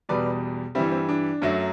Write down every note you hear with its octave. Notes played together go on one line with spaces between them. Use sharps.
E2 B2 G3 B4 D5
G2 E3 G3 C4 E4
C4
D4
F#2 F#3 A3